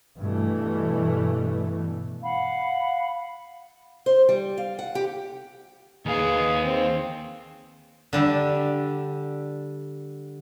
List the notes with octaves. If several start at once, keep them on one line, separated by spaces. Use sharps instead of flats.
G2 B2 E3 A3
F5 F#5 B5
C5
G3
F5
F#5
G4
D#2 G#4 B4 F5
C4
D3 G3 G4 E5